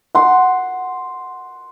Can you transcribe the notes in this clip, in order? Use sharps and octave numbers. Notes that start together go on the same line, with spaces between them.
F#5 C6